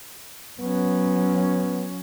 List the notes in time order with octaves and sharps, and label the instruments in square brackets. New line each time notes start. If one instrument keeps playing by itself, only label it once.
[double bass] F#3 C#4 [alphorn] B3